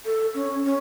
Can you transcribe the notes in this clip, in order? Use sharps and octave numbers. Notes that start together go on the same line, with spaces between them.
A4
C#4
C#4